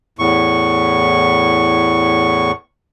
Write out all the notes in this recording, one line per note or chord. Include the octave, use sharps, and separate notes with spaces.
E2 A2 C#6